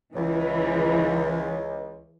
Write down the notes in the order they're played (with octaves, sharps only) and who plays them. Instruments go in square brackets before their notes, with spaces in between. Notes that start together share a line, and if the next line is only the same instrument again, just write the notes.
[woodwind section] C#2 [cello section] E3